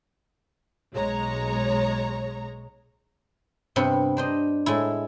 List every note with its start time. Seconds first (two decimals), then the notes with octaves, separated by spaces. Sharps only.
0.92 B1 G#3 C#5 A#5
3.76 G2 C3 B3 C4
4.17 D4 C5 D#5
4.66 A2 G#3 E4